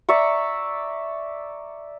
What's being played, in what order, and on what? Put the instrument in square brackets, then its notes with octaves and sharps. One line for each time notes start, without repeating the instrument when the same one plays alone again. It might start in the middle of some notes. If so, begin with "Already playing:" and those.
[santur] D5 E5 A#5 C#6